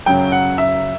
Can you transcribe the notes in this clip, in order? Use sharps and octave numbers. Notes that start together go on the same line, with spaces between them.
F#2 C#3 F#3 G5
F#5
E5